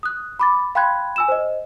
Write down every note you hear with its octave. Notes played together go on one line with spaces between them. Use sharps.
D#6 F#6
B5 D6 A6
F5 G5 B5 C6 F#6 G#6
G#5 E6 E7
C5 D#5